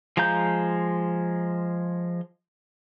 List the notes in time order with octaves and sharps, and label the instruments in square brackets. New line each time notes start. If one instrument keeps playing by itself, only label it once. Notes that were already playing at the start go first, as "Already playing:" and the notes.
[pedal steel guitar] F3 G#3 F5 A#5 G6